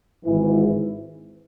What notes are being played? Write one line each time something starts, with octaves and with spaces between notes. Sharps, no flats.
G#1 G#2 E3